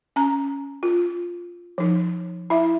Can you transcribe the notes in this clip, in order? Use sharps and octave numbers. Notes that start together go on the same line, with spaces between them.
C#4 A#5
F4
F3 D#4
E4 E5